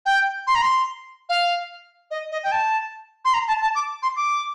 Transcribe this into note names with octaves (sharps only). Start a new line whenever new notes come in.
G5
C6
A#5
C6
F5
D#5
D#5
G5
A5
C6
A#5
A5
A5
D6
C6
D6